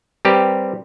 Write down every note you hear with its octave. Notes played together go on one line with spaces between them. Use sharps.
G3 C4 G4 A#4 B4